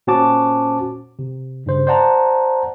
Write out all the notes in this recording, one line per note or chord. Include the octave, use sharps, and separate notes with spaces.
A#2 C#4 F#4 C5 A5 D6
C3
G2 C#3 C5
C5 D5 F#5 A5 A#5